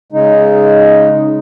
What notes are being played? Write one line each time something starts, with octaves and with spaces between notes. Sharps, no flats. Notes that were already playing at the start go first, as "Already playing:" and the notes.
C#3 G#3 D#4